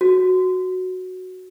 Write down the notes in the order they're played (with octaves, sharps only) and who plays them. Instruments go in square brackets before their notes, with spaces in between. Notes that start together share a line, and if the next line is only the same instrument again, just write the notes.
[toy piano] F#4